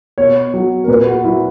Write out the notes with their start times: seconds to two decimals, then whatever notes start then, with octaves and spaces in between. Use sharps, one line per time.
0.18 B2 C#5
0.54 F#3
0.84 A#4
0.88 A#2 B4
1.06 F#4
1.24 F#3 E4